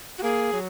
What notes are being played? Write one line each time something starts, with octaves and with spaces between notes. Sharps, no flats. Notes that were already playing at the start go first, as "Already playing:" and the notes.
F#4
A#3 G#4
F#3